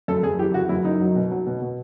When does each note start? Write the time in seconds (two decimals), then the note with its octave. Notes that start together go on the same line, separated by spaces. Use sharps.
0.08 F#2 A4
0.23 F#2 G#4
0.39 E3 G4
0.54 C#3 F#4
0.69 F#2 E4
0.85 F#2 D#4
1.00 F#3
1.15 B2
1.31 F#3
1.46 B2
1.62 B2